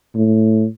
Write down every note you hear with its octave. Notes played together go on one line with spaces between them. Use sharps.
A2